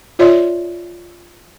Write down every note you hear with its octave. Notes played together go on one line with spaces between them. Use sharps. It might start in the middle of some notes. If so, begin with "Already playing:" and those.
F4 C#5 D5 E5 C6